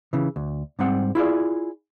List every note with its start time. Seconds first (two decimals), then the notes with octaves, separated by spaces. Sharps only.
0.13 C#3 E3
0.36 D2
0.79 G#2 G3 C4 F#5
1.15 E4 F4 G#4 D5